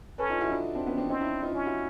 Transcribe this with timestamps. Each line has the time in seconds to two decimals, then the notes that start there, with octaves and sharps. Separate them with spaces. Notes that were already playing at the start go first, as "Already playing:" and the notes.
0.18 C#4 A4 B4
0.30 D#4 F4
0.41 E4 F#4
0.48 D#4
0.52 D4 E4
0.75 C4 D4
0.86 B3 C#4
0.98 C4 D4
1.09 C4 C#4 D#4
1.21 D4 E4
1.43 D#4 F4
1.54 C#4
1.66 E4 F#4